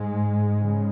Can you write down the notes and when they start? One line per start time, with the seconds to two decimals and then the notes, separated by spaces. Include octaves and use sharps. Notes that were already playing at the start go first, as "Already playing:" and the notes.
Already playing: G#2 G#3
0.61 C#3